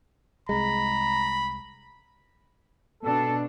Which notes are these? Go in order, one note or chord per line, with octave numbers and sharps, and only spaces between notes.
C2 G#3 A#5 B5
B2 D4 A4